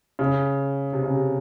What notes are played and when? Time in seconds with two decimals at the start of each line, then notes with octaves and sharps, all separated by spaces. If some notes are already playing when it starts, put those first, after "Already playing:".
0.19 C#3
0.93 C3
1.03 C#3
1.14 C3